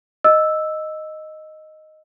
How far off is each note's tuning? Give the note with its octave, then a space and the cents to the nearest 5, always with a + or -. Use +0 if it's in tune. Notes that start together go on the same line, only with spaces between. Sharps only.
D#5 +0 E6 -5